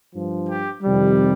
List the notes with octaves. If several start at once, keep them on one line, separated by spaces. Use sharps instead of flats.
G2 F3
G4
F2 C3 D#3 G3